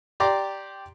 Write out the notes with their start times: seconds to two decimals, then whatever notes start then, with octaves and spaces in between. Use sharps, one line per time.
0.20 G4 D5 A#5 C6 D6